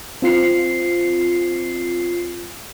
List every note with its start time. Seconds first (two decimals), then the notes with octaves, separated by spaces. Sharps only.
0.22 C4 F4 C7 C#7